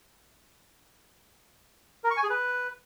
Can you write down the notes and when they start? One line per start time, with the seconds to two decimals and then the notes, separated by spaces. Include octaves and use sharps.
2.04 A#4
2.11 C#6
2.17 G#5
2.23 G#4
2.30 B4